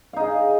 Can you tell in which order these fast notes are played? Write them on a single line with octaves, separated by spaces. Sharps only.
F5 D#4 G#4